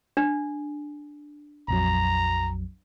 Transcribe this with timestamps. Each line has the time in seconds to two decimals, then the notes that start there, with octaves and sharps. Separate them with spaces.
0.17 D4
1.68 A#1 F2 F#3 A#5